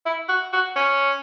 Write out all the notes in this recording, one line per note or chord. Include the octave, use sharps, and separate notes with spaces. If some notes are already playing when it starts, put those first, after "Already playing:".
E4
F#4
F#4
C#4